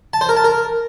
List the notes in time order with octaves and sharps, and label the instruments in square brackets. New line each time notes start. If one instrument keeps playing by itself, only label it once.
[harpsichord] A5
C5
A#4
A5
A#4